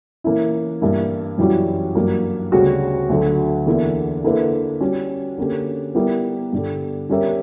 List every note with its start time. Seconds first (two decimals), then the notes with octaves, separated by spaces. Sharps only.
0.24 E3 A#3 C#4 E4
0.81 G2 E3 A#3 E4
1.38 F#2 E3 G3 C#4 F#4
1.95 G2 F#3 A#3
2.52 D2 C#3 G3 C#4 F#4
3.09 D2 D3 F#3
3.66 E2 D3 A#3 E4
4.24 D3 A#3 E4 B4
4.81 G3 C#4 F#4
5.38 D3 A#3 C#4 G4
5.95 G3 B3 E4 A#4
6.53 G2 D3 G3
7.09 G3 C#4 G4 A#4 E5